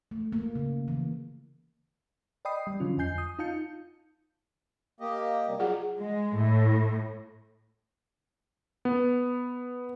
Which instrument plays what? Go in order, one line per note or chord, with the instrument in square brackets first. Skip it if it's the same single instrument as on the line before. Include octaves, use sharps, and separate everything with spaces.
[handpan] A3
A#3
C#3
E3
[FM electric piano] D5 D#5 G5 B5 D#6 C7
G3
D3 F3 F#3 C#4 F4
F2 D#5 G#5 G6 C7
D#6
D#4 F4 F5 A5 G6 C#7
[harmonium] A#3 G4 D#5
C3 G3
[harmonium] F#3 [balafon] F4 G#4 F#5
[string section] G#3
A2
[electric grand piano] B3